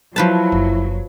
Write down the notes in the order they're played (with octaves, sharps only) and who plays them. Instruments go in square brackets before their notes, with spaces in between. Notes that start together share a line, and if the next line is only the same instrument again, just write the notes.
[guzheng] F3 B4 A5 [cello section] F#3 [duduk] E4
[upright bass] F#1